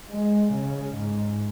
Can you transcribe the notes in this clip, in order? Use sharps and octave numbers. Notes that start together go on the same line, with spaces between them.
G#3
C#3
G#2